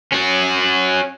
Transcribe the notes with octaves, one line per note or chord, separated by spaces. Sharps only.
C#4 F#4